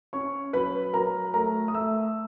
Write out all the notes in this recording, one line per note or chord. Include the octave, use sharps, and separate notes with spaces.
C#4 C#5 C#6
F#3 B4 B5
F#3 A#4 A#5
A3 A#4 A#5
D#6
A3 E5 E6